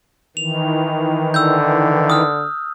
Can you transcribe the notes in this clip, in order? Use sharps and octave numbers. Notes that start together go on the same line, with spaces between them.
D#3 E3 F7
D3 E6 G6
D#6 F6